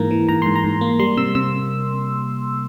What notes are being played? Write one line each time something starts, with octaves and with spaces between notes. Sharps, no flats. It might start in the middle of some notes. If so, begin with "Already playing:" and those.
Already playing: G#2 E3 A#3 A#5
E3
G#2 A#5
G#2 C6
A#5
G#2
A#3
G3 C6
C3 E6
C3 E6